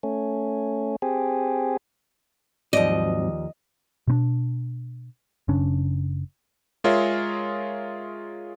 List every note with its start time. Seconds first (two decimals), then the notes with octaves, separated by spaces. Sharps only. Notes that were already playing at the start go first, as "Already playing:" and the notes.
0.03 A3 C#4
1.02 C4 G4 G#4
2.73 D#2 G#2 F3 F#3 C4 D5 D#5
4.08 B2 C4 D4
5.48 F#1 C#3 C#4 D4
6.84 G#3 F4 G#4 A#4 C#5 E5